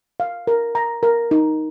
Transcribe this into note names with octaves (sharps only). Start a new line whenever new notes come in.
F5
A#4
A#5
A#4
D#4